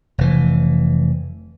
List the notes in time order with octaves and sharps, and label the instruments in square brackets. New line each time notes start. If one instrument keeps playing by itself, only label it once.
[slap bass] F1 E3